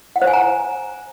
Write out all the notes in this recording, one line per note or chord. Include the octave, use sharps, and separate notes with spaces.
F#5
C5
G#5
A#5